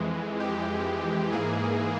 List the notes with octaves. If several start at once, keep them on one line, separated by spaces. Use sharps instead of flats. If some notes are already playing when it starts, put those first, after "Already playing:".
Already playing: F2 E3 G#3
G4
G#2 E3 A#3 G#4